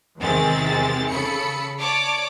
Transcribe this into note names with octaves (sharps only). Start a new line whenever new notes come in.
E2 C3 D#3 G#3 C4 A6
C#3 A4 B5 C#7
C#5 D5 A5 D6